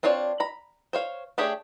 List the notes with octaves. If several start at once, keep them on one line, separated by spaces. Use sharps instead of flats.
C4 D4 F4 C#5 D5
A#5 B5
C5 C#5 F5
A3 D4 G4 G#4 C#5